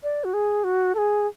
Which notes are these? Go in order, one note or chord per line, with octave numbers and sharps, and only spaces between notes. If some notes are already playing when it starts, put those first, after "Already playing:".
D5
F#4
G#4
F#4
A4
G#4